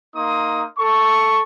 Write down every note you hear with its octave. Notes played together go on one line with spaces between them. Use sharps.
A#3 D#4 C6 D#6
A4 C#6